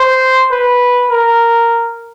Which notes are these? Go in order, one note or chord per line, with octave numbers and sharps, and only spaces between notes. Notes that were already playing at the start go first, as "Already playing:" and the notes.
Already playing: C5
B4
A#4